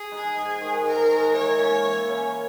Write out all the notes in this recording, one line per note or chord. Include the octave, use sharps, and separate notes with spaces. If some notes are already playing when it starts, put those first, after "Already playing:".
Already playing: G#4
G#3 D#4
G#2
D#3 G#3
G#2 A#4
D#3 G#3
E3 C#5
A#3 C#4
E3
A#3 C#4